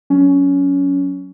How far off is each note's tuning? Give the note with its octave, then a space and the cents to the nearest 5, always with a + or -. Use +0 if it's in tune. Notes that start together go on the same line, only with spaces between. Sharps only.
F#3 +0 C#4 +15